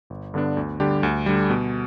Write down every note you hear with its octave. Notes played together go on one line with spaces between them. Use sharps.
G1
G2 D3 B3 D4
D2
D3 G3 D4 G4
D2
D3 G3
B2